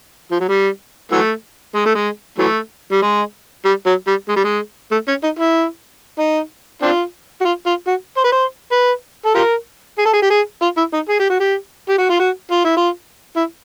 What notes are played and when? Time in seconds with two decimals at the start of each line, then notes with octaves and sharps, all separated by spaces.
0.31 F3
0.40 F#3
0.48 G3
1.12 E3 F#3 A3
1.75 G#3
1.86 A3
1.95 G#3
2.38 E3 F#3 A3
2.92 G3
3.02 G#3
3.65 G3
3.86 F#3
4.07 G3
4.28 G#3
4.36 G3
4.44 G#3
4.92 A3
5.08 C#4
5.23 D#4
5.39 E4
6.19 D#4
6.82 C4 D4 F4
7.41 F#4
7.45 F4
7.66 F4
7.87 F#4
8.17 C5
8.24 B4
8.32 C5
8.72 B4
9.26 A4
9.35 F4 G4 A#4
9.99 G#4
10.06 A4
10.13 G#4
10.22 G4
10.30 G#4
10.62 F4
10.77 E4
10.93 D#4
11.09 G#4
11.19 G4
11.30 F#4
11.40 G4
11.89 G4
11.98 F#4
12.09 F4
12.19 F#4
12.52 F4
12.65 E4
12.77 F4
13.36 E4